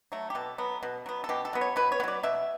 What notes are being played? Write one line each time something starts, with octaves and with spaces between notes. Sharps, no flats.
F#3 A3
G4
B2 A4
F#3 B3
B2
F#3 B3
A4
B2 G4
A4
F#3 B3
C#5
B2 B4
C#5
B3
F#3 D5
B2 E5